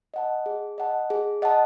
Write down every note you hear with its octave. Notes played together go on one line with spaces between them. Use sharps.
D#5 F#5 A5
G#4
D#5 F#5 A5
G#4
D#5 F#5 A5